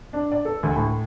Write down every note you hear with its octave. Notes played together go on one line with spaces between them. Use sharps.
D4
D5
A4
D2
A2